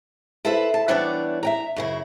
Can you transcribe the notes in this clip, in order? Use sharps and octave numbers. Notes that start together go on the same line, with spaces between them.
E4 A4 B4 C5 E5
A5
E3 G3 B3 D4 C#5 D5
E5 G5 A#5
F#2 C#3 E4